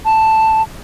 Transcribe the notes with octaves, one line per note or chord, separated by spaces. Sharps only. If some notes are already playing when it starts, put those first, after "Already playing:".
A5